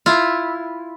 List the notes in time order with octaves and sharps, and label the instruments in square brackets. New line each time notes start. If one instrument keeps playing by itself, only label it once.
[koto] E4 F4